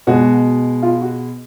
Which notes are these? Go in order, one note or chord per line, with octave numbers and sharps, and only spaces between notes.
B2 G#3 F#4
F4
F#4